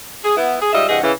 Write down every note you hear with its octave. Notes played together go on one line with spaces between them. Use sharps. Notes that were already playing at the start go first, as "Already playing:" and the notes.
G#4
B3 E4
G#4
G#2 G3 F4 D#5 E5
G2 C3 E3 G#4 D#5 F#5
C#3 E3